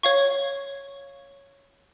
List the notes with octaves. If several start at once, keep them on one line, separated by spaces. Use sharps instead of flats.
C#5 F5 C#6